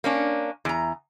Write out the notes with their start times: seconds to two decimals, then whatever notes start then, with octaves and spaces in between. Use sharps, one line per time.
0.04 A#3 C#4 D4
0.65 E2 A#5